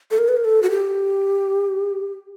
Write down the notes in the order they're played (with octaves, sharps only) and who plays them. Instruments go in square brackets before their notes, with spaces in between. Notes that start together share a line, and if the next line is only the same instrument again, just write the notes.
[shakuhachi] A4
A#4
B4
A#4
A4
F#4
G4